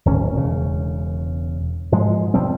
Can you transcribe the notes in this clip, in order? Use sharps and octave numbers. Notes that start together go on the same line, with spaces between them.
D1 G#1 C#4
E1 C#3
G#2 F3 G#3
E1 F3 G3 C4